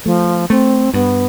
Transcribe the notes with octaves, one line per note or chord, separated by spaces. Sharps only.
F3 A3
A3 C4
G2 B3